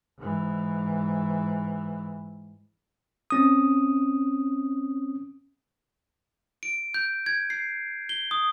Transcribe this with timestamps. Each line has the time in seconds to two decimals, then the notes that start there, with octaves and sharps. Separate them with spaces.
0.18 G#2 E3
3.30 C4 C#4 D#6
6.63 D7
6.94 G6
7.26 G#6
7.50 C7
8.09 G7
8.31 D#6